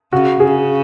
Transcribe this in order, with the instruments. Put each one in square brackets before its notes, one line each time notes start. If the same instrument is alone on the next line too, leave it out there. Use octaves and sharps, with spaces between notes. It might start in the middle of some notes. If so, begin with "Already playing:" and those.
[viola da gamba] C#3 [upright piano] F#4
[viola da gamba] C#3 [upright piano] G#4